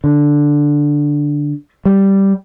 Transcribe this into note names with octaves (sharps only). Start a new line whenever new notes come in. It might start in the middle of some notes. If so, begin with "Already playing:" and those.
D3
G3